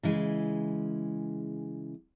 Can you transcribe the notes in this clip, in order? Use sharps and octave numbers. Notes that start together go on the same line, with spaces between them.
C#3 E3 G#3